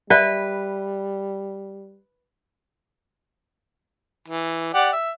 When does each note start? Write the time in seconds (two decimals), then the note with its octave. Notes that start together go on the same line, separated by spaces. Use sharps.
0.10 G3 B4 D5 E5
4.28 E3
4.74 G4 D5 F#5
4.93 E5